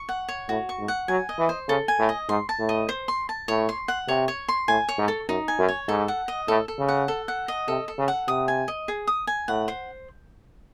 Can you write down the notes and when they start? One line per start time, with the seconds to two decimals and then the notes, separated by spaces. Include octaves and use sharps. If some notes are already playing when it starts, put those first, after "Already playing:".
Already playing: C#6
0.09 F#5
0.29 C#5
0.48 A2 F#4
0.69 C#6
0.79 G#2
0.88 F#5
1.08 F#3 G#5
1.29 D#5
1.39 E3
1.49 C5
1.68 C#3 A4
1.88 G#5
1.99 A2
2.09 D#5
2.29 G#2 C6
2.49 A5
2.59 A2
2.69 D#5
2.89 C5
3.08 C6
3.29 A5
3.48 A2 C#5
3.69 C6
3.88 F#5
4.08 C3 C#5
4.28 C#5
4.49 C6
4.68 A2 G#5
4.89 C#5
4.98 G#2
5.08 A4
5.28 F#2 D#4
5.48 G#5
5.59 F#2
5.69 C#5
5.88 G#2 A4
6.08 F#5
6.28 D#5
6.48 A2 A4
6.68 A4
6.79 C#3
6.88 F#5
7.08 A4
7.28 F#5
7.48 D#5
7.68 C3 A4
7.88 A4
7.98 C#3
8.08 F#5
8.27 C3 D#6
8.48 G#5
8.68 D#5
8.88 G#4
9.07 D#6
9.27 G#5
9.48 A2 F#5
9.68 C5